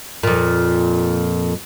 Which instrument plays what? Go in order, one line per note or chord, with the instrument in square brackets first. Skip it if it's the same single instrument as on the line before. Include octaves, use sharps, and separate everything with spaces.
[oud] F2 A#2